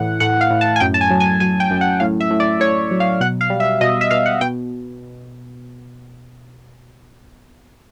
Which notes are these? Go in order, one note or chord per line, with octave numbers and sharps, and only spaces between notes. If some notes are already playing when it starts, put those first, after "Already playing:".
Already playing: A2 E3 F#5
A2 F#5
F5
A2
A5
G#5
F#2 G5
A5
G#5
F#3
G#5
F#3 G#5
G5
F#2
F#5
A2 F5
E5
A2
D5
A2 C#5
F#3
F5
B2 F#5
F5
G3
E5
B2 D#5
E5
B2 F5
F#5
B2 G5